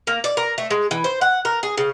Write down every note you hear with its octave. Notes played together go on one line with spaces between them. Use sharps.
A#3
D5
A#4
A3
G#3
E3
C5
F#5
A#4
G#4
C#3